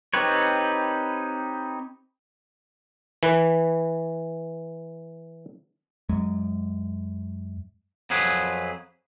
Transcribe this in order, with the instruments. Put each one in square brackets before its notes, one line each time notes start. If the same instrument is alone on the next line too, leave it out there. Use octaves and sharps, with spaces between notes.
[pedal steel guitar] C4 D#4 G4 B4 C#5
[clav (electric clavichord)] E3 B4
[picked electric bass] F#2 G#3
[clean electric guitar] F2 F3 F#3 G#4 B4